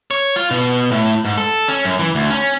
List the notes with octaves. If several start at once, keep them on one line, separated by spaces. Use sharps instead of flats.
C#5
F4
B2
A2
G#2
A4
C#4
F#2
E3
D2
C#4